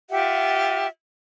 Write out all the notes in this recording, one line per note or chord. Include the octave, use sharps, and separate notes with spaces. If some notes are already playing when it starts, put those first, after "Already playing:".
F4 G4 E5 F#5